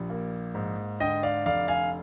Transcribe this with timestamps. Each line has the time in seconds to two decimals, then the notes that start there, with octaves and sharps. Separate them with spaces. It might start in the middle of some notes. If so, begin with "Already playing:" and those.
Already playing: A#1 G3
0.10 A#3
0.55 G#2
1.00 D3 D#5 G5
1.23 D5 F5
1.46 F1 D5 F5
1.68 F5 G#5